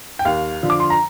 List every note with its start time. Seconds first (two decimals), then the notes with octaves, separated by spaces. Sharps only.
0.19 G5
0.25 D#2 F5
0.63 D3 F3
0.70 D6
0.80 C6
0.90 A#5